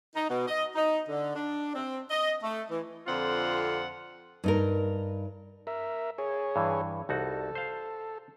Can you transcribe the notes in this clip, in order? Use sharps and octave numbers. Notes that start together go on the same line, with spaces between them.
D#4
B2
D#5
D#4
D3
D4
C4
D#5
A3
E3
F2 D3 C4 F4 F#5
G2 D#4 A#4
A#4 E5
G#4 C#5
G2 E3
C2 D#4 F#4 A4
C5 F5